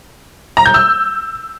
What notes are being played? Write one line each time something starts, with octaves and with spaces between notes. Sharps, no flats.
A#5
G6
E6